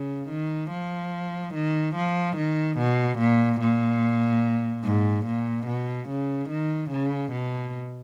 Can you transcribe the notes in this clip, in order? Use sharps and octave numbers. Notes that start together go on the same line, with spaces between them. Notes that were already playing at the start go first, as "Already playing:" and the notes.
Already playing: C#3
D#3
F3
D#3
F3
D#3
B2
A#2
A#2
G#2
A#2
B2
C#3
D#3
C#3
B2